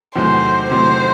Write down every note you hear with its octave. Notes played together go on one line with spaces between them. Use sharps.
E2 C3 D#3 F#3 A3 C5
E2 C3 D#3 F#3 A3 C5